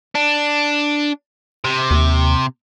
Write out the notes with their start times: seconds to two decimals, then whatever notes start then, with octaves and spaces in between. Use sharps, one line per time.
0.15 D4
1.65 C3
1.91 D#2